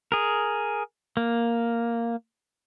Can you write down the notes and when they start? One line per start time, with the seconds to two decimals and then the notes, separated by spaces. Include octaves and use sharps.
0.12 G#4 A#4
1.17 A#3